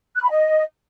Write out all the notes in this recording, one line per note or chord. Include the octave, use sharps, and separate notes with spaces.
F#6
B5
D#5